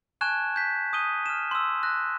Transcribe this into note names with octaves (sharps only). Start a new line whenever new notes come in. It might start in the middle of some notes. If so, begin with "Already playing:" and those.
G#5 A5 C#6 F#6 G#6 E7
G6 B6
C#6 D#6 G6 D#7 G7
F6 E7
C6 E6
F#6 A#6